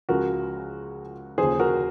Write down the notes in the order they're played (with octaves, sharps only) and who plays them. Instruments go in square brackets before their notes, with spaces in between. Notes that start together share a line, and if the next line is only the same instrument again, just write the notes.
[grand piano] C#2 C#3 F3 F#4 A#4
D#2 C#3 F3 G#4 C5
F#4 A#4